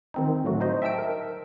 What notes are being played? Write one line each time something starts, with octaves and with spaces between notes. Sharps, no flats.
D#3 C4 D#4
A2 D3 F#3 A3 F#4
D#4 C5 D#5
E5 G5 A5 E6 D7
A#4